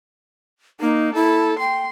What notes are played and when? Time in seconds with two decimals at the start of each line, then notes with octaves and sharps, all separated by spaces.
0.80 A#3 D#4
1.15 E4 A4
1.59 G5 C6